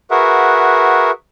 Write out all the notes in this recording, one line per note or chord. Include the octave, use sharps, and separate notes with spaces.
F#4 G#4 A#4 B4 E5 F#5